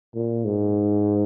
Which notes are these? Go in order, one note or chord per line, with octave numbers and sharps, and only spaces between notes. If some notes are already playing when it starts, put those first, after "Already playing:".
A#2
G#2